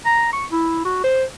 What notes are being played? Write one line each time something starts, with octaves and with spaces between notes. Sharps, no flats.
A#5
C#6
E4
F#4
C5